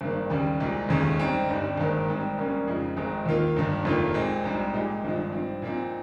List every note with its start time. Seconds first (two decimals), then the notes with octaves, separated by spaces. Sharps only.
0.01 G#1 G2 D#3 A#3
0.30 D#2 C#3 G3
0.60 C2 A#2 G#3
0.89 F1 D#2 C#3 G#3 C#4
1.19 G#2 G3 C4 D#4
1.48 G1 G2 G3
1.77 G#1 G#2 D#3 A#3
2.08 G#2 G3 C4
2.37 A#1 G#2 G3 A#3 C#4
2.67 F2 C#3 F3 G#3 D#4
2.97 G#1 G#2 D#3 G#3 C4
3.26 D#2 D#3 A#3 F4
3.56 G1 G2 D#3
3.85 F1 D#2 D#3 A#3 F4
4.14 A#2 G#3 C4
4.44 A#1 G#2 G3
4.74 A#2 G#3 D#4 G4
5.04 G#1 G2 F3 G#3
5.33 G2 F3 C4
5.62 A#2 F3 C4 D#4